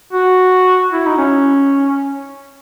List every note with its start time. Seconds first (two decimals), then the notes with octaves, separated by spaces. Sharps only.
0.13 F#4
0.93 E4
1.06 D#4
1.18 C#4